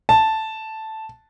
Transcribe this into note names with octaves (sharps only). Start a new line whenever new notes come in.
A5